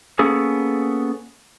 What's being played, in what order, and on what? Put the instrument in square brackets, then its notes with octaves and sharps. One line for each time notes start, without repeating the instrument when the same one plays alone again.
[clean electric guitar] A#3 B3 C#4 G#4 A4